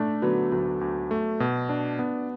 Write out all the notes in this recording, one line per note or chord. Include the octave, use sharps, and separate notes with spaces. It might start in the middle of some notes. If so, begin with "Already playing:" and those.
Already playing: A3 D4
D3 F#3 B3
D2 F#3
D2
A3
B2
D4
B3